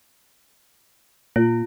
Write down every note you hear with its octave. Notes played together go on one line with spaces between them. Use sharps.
A#2 F4